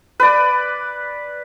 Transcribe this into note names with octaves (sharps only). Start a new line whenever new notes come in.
B4 D5